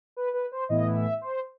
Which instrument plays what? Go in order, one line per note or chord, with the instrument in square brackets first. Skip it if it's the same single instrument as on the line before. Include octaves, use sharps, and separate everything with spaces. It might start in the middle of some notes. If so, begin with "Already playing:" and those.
[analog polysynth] B4
B4
C5
A2 E3 B3 E4 D#5
E5
C5